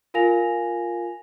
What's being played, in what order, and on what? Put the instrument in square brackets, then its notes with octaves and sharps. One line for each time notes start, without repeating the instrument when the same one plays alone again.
[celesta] F4 A#4 F5 G#5 A#6 F7